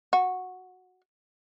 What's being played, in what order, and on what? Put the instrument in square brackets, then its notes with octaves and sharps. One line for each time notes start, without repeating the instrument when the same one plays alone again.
[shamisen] F#4